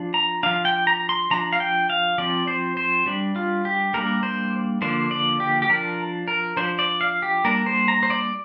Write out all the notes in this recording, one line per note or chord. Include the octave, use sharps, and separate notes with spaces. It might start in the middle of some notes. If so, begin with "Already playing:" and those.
Already playing: F3 D4
A#5
F3 D4 F5
G5
A#5
C6
F3 D4 A#5
F5
G5
F5
F3 C4 D5
C5
C5
G3 D4
F4
G4
G3 A#3 D4 A#4
C5
D3 F3 A#3 D4 C5
D5
G4
G4
F3 D4 A#4
A#4
F3 D4 C5
D5
F5
G4
G3 A#3 D4 A#4
C5
A#5
C5
D5